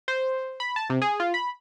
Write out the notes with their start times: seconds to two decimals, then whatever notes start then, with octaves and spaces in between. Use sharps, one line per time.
0.08 C5
0.60 B5
0.76 A5
0.90 C3
1.02 G#4
1.20 F4
1.34 B5